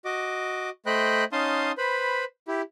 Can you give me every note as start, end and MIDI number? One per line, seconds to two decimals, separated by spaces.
0.05 0.70 66
0.05 0.70 75
0.05 0.70 86
0.86 1.24 57
0.86 1.24 72
0.86 1.24 75
0.86 1.24 79
0.86 1.24 83
0.86 1.24 90
1.32 1.72 61
1.32 1.72 63
1.32 1.72 77
1.32 1.72 81
1.32 1.72 84
1.32 1.72 87
1.78 2.24 71
1.78 2.24 72
1.78 2.24 83
2.48 2.62 64
2.48 2.62 67